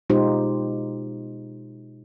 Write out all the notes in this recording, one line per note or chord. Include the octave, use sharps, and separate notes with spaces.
B2 G#3 D#4 F4 G4 C5